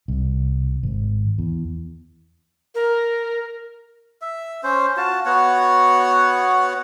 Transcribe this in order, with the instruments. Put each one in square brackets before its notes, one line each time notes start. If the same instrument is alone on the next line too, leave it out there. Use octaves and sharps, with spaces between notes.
[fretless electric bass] C2
G#1
E2
[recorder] A#4
[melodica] E5
C#4 C5
F4 F#4 A5
B3 F#4 C#5 F#5